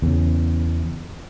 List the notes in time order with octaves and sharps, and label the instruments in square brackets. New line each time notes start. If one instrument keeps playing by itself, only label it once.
[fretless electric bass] E2 C#3